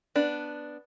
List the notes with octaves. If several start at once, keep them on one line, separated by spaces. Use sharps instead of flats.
B3 D4